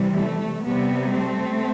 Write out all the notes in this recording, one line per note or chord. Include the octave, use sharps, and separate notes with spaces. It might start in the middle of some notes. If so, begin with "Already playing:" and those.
Already playing: C3 E3 G3
A3
C3 G3 B3
A3 C4